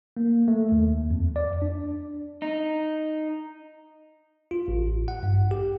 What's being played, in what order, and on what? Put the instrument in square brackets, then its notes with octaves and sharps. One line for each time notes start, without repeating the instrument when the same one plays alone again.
[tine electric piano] A#3
A3
D#2
F2
D5
D4
[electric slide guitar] D#4
[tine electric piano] F4
A1
F#5
G2
G4